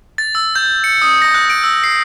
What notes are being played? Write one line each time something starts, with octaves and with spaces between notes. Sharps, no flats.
A6
E6
G6
C#7
D#6
A#6
F#6
D7
E6
C7